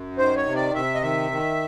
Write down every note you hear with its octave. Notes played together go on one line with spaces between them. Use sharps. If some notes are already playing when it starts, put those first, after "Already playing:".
Already playing: F#2
D#3 C5
C#5
C3
D5
C3 E5
D#5
D#3 E5
D#3